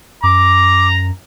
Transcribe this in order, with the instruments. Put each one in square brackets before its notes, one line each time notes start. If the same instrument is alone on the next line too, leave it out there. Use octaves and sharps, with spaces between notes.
[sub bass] F#2 [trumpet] A#5 [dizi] D6